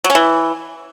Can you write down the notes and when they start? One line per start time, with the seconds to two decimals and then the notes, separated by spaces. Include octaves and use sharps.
0.04 F#3
0.10 C#4
0.15 E3